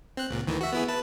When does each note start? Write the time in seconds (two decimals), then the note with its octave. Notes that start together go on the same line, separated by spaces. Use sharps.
0.17 C4 F#6
0.30 C#2 A#2
0.47 D2 D#3 E3
0.61 F#4 E5
0.73 B3 E4 G#4
0.88 B4 A5